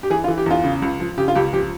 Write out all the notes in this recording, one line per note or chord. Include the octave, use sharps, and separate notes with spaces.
G4
E3 G#4
F4
E3
G4
E2 F4
C#3
C#2
F3
C#3 G4
F4
C#2 G4
F3 G4